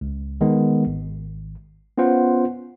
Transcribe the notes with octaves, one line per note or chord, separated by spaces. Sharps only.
C#2
D#3 G#3 B3
G#1
B3 C#4 F4 C5 F#5